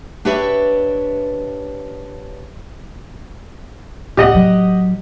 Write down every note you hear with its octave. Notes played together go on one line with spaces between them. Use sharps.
D4 G4 B4 C#5 D5 E5
D2 A2 G4 D#5 F#5
A2 F#3